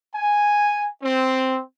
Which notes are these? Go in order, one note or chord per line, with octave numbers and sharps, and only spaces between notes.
G#5
C4